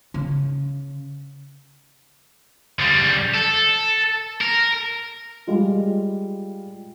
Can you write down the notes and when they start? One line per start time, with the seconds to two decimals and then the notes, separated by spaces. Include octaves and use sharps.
0.14 C#3
2.79 C#3 G3
3.35 A4
4.41 A#4
5.47 G3 G#3 F4